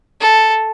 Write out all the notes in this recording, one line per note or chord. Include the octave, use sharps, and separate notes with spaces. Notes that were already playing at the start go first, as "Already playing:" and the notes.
A4